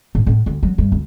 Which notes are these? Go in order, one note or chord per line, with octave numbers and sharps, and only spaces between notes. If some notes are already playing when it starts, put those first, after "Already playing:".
A2
A2
D2
F#3
G2
D2